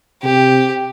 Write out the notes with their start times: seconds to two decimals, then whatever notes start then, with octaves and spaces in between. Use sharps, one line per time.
0.23 C3 G4